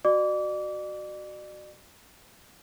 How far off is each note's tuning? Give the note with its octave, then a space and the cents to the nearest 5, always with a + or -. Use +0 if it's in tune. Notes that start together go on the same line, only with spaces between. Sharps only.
F#4 +0 D5 +40 D6 -30